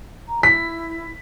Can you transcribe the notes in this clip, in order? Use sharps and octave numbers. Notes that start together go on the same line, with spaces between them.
A#5
E4 B6